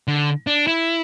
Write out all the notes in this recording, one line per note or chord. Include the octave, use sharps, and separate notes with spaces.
D3
D4
E4